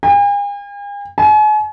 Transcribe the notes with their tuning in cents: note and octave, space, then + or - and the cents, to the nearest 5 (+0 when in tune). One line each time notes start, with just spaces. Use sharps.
G#5 -45
G#5 +40